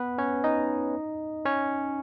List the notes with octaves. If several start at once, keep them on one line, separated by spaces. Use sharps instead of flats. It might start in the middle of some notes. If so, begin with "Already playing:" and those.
Already playing: B3 B4
C#4 C#5
D#4 D#5
C#4 C#5